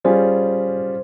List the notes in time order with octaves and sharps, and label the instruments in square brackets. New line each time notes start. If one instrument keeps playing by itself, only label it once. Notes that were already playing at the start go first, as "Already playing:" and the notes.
[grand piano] G3 C#4 F4 G#4 [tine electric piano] C5